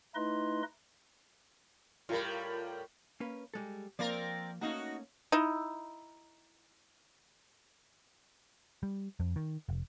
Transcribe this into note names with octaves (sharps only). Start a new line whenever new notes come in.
A3 D#4 E4 B4 D#5 C6
A2 G3 F4 A#4
A#3 C#4 B4
G3 G#3 A4
F3 A#3 C4 A#4 D5 A#5
A3 A#3 C#4 D#4 F#4
D#4 E4
G3
F2
D#3
F1